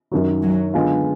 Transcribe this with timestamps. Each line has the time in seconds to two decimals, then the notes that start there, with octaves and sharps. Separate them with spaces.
0.11 F#2 D#3 F#3
0.43 F#3
0.74 D3 G#3 B3 F4